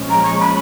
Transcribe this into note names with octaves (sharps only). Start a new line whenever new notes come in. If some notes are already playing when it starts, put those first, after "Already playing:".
Already playing: A#2 F3 G#3 C#4
A#5
C#6
B5